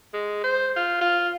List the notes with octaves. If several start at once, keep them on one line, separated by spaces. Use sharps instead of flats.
G#3
C5
F4
F4